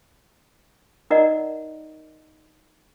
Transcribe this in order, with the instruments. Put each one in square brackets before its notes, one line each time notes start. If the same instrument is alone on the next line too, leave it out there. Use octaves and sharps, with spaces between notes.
[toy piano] D#4 A#4 D5 D#5 F#5 A#5